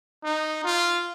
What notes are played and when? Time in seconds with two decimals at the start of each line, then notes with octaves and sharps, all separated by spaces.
0.24 D#4
0.64 F4